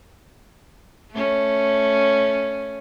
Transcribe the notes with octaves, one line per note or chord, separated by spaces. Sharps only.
A3 C#4